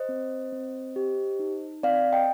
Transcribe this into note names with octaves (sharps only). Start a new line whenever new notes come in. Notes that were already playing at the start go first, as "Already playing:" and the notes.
Already playing: C5 D#5
C4
C4
G4
D#4
C4 D5 F5
D#5 G5